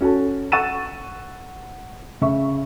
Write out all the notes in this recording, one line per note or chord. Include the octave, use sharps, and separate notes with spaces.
C#4 F#4 A4 A5
F#5 C#6 E6 A6 D#7 E7
C#3 E5 C#6